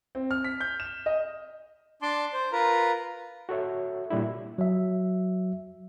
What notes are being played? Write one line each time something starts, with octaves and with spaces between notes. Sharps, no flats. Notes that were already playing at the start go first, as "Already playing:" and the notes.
C4
F6
B6
G6
E7
D#5
D4 A5 C6 D6
C5
F4 A#4 B4 A#5
F#4 A4 C#5 E5
A#2 G3 D4 E4
F#3 E5